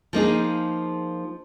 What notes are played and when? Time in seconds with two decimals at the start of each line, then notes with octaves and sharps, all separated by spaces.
0.13 F3 A#3 D#4 G#4